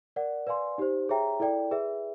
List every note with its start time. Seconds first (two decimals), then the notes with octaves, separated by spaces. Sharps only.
0.16 A#4 D5 F#5
0.47 B4 D5 F5 G#5 C6
0.78 D#4 G4 C5
1.09 G#4 C#5 E5 G5 A#5
1.40 E4 A4 D5 G5
1.71 G#4 B4 E5